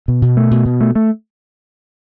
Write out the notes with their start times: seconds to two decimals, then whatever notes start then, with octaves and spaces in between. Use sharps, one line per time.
0.08 B2
0.22 B2
0.37 A3
0.51 B2
0.65 B2
0.81 A3
0.95 A3